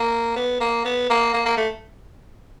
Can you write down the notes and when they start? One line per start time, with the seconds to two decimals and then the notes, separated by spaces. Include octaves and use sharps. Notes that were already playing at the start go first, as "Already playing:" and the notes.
Already playing: A#3
0.36 B3
0.60 A#3
0.85 B3
1.09 A#3
1.34 A#3
1.45 A#3
1.57 A3